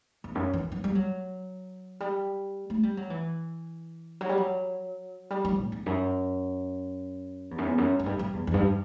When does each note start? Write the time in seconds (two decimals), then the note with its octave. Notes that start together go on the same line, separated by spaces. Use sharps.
0.24 E2
0.35 F#2
0.54 E3
0.72 F#3
0.84 G3
0.95 F#3
2.00 G3
2.70 A3
2.83 G3
2.97 F#3
3.10 E3
4.21 F#3
4.29 G3
4.37 F#3
5.30 G3
5.45 G3
5.58 A2
5.72 E2
5.86 F#2
7.51 E2
7.58 F#2
7.66 E2
7.78 F#2
7.99 F#2
8.06 G2
8.19 G2
8.33 E2
8.47 E2
8.54 G2